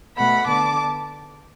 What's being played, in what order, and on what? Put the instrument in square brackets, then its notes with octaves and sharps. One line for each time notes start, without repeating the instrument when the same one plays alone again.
[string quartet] B2 A3 F#5 B5
D3 B3 A5 D6